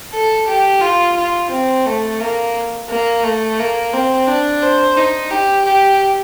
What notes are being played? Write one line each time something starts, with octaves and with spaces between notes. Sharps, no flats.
A4
G4
F4
F4
C4
A3
A#3
A#3
A3
A#3
C4
D4
C5
D#4
G4
G4